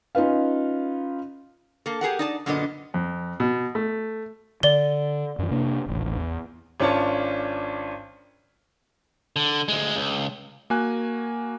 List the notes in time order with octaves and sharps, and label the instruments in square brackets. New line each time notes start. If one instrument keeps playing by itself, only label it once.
[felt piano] C#4 D#4 F4 B4 F5
[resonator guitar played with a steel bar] A#3 A4
G4 G#4 A#4 F#5
D#4 D5 A5
F#2 A#2 D3 B3 D4 D#5
[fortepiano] F2
B2
A3
[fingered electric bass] D3 [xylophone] D5 G7
[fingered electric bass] F#2 E3
C3 A#3 D4
D#1 A1
E2
[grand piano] G#1 C#4 D4 F4 C#5 A5
[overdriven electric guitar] D3
D2 G#3
C#2
[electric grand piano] A#3 F#4 G#5 F#6